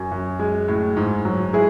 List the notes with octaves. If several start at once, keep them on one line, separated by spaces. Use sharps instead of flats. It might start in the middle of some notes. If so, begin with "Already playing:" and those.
Already playing: F#2
F#2
G#3
A2
G#2
F#3
G#3 E4 G#4